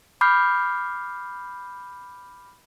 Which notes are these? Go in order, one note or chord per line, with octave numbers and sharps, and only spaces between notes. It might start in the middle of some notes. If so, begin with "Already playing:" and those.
B5 D6 F6 G6 C7